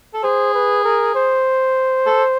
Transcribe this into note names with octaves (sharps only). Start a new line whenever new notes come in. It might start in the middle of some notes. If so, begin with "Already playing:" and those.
A4
G#4 C5
B4
A#4
C5
A4